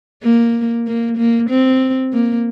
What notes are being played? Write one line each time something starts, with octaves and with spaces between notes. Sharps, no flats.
A#3
A#3
A#3
C4
A#3